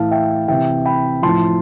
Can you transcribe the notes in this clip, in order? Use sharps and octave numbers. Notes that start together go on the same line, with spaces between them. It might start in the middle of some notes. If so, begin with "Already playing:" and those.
Already playing: A2 E3 F5 A5
E5 G5
C3 E3 E5 G5
G5 B5
A2 F3 A5 C6